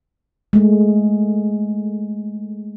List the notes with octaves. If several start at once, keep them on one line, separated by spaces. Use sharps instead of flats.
G#3 A3